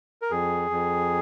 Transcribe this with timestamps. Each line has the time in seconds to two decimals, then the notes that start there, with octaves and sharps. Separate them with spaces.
0.22 A#4
0.31 F2 G#4
0.71 F2